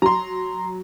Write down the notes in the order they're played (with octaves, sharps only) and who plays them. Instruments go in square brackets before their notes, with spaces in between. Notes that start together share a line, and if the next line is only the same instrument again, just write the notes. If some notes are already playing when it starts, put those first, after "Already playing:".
[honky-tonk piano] F#3 [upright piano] A#5 C6